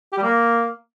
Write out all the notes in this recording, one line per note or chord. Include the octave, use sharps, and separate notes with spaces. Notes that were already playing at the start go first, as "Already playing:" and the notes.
G4
G3
A#3